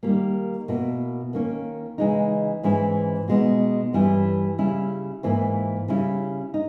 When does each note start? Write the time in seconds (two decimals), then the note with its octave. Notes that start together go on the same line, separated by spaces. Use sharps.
0.03 D#3 G3 A#3
0.68 B2 A#3 E4
1.33 D#3 A#3 C#4
1.98 C#3 E3 G#3 D#4
2.63 G#2 E3 G#3 C#4 E4
3.28 B2 G#3 B3 D#4
3.93 G2 E3 G3 C#4 E4
4.58 C#3 G3 C#4 E4
5.23 G#2 E3 A#3 E4
5.88 C#3 G3 C#4 E4
6.54 D#4